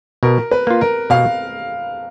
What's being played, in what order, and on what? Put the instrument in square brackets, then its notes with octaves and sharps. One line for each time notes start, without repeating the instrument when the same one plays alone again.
[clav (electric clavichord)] B2 [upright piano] A#4
[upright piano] B4
[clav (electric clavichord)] A#3 F4
[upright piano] A#4
[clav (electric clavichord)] B2 [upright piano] F5